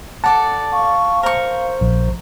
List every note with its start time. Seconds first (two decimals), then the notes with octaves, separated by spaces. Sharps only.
0.24 A4 D5 F#5 A5
0.73 F5 C#6
1.23 A#4 C5 C#6
1.81 A#1